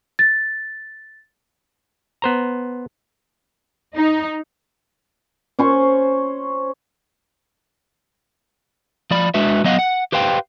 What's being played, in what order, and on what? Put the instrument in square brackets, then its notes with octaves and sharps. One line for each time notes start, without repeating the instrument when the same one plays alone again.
[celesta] A6
[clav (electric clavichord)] B3 C5 A#5
[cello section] D#4
[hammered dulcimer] C#4 C5 C#6
[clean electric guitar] F3 D5 B5
G#3 D4 F#4 B4 E5
F#3 B3 D#5 F5 F#5
F#5
G4 B4 C5 F5 G5